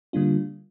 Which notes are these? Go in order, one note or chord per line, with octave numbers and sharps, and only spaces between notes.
D3 G3 A#3 D4 F4